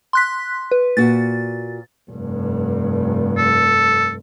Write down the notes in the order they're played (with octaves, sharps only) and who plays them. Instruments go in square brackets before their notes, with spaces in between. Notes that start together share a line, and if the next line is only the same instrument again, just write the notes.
[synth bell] C6 F#6 B6
B4
[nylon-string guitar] A#2 F#4 [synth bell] A6
[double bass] F1 G2
[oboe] A4